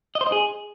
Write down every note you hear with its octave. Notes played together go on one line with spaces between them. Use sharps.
D#5
C5
D#5
G#4